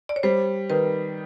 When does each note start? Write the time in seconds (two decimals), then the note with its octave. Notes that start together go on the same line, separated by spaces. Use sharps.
0.09 D5
0.16 C#5
0.23 G3 C5
0.70 D#3 B4